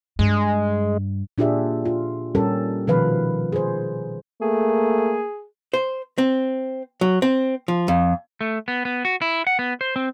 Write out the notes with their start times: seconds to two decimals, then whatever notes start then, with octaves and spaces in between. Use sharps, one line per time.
0.19 G2 G#3
1.38 A#2 D4 F4 G4 G#4 E5
1.85 F4
2.35 A#2 G3 C#4 G4 A4 A#4
2.87 B2 D#3 F3 B4 F5
3.52 G#4 C5
4.42 A3 A#3 G#4
5.73 C5
6.18 C4
7.01 F#3
7.22 C4
7.68 F3
7.88 F2
8.41 A3
8.68 B3
8.85 B3
9.05 F#4
9.22 E4
9.47 F#5
9.59 B3
9.81 C5
9.96 C4